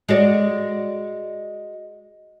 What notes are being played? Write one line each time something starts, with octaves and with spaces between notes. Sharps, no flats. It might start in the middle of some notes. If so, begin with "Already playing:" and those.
G#3 F#4 D5